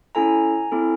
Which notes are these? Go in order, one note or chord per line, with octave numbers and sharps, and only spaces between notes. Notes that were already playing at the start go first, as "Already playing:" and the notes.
C#4 E4 A4 G#5 A#5
C4 E4 A4